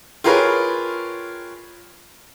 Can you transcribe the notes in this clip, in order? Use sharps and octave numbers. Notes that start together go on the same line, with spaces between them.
F4 G4 G#4 A#4 B4 C#5